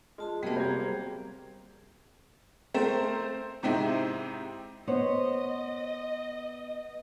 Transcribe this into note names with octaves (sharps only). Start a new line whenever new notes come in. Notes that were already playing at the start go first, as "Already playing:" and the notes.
G#3 F4 A5 C6
C3 F#3 G3 A#3 B3 G#4
C5 A#5 G#6
A3 C4 A#4 C5
G#2 C3 C4 D#4 E4
B3 C5 C#5 D#5